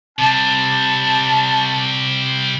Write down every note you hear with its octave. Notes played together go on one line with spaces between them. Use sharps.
C3 G3 A5